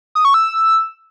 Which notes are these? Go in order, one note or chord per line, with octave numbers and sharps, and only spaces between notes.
D#6
C#6
E6